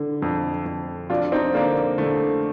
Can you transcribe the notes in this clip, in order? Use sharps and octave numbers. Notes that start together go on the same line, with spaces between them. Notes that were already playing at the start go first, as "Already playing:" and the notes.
Already playing: D3
F2
F2
F2 D4 F4
C4 D#4
D3 A#3 D4
D3 A3